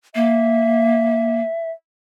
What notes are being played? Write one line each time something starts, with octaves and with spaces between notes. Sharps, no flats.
A#3 E5